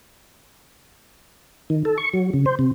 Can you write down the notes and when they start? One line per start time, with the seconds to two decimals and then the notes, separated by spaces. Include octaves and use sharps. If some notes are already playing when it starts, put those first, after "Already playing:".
1.70 D#3
1.85 A4
1.98 C#6
2.13 F#3
2.33 C#3
2.46 C5
2.59 C3